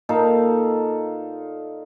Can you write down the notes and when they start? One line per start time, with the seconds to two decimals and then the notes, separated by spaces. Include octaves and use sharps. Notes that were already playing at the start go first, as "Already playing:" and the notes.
0.09 A#2 D#4 A4 F5